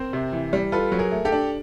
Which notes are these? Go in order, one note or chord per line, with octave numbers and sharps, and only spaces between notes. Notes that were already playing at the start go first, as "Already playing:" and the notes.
Already playing: C4 A#4 C5
C3
E3
G3
F4 A4 B4
F#3
G#4 A#4
A3
G4 A4
D4